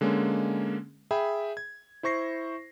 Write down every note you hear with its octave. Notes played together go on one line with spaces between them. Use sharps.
D3 G#3 A#3 C#4
G#4 E5 G5 B5
G#6
E4 C5 C#6 A#6 C7